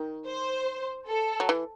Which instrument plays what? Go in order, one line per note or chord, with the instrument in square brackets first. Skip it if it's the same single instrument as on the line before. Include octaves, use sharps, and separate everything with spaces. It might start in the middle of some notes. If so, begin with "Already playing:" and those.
Already playing: [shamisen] D#3
[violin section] C5
A4
[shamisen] F#3
E3